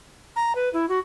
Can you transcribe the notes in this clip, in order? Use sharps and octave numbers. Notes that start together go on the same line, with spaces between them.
A#5
B4
E4
F#4